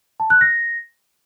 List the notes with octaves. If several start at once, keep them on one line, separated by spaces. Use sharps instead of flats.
A5
F#6
A#6